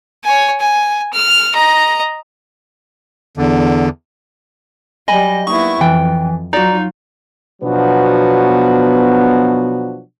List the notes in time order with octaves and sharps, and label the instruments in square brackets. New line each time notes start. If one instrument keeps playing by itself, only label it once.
[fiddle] C#5 G#5
G#5
F6
D#5 A#5
[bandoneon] E2 D3
[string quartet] F#3 G3 [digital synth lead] D#5 [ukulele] G#5 B5
[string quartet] A#3 B3 E4 [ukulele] D#4 [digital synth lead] C#6
[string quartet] F2 [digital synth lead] E3 [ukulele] G5
[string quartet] F#3 F4 [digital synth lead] D#4 [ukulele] F#4 D5
[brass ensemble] B2 F3 F#3 B3 D4 F#4